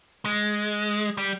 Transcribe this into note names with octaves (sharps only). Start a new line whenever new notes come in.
G#3
G3